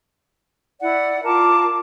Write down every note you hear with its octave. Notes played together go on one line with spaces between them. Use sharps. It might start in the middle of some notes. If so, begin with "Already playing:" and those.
E4 D5 F#5
F4 A#4 A5 D6